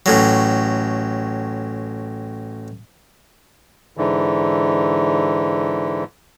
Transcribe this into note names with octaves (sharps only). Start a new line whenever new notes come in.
A1 A2 F#3
G#2 D3 E3